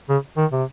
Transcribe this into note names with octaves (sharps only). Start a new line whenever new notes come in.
C#3
D#3
C3